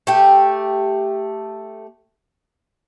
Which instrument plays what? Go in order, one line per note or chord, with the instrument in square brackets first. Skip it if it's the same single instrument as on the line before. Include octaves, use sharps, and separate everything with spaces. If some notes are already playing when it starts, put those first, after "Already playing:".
[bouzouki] A3 G4